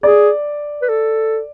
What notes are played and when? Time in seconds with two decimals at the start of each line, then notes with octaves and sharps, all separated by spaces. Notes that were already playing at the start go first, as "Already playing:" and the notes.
0.03 G#4 D5
0.82 B4
0.89 A4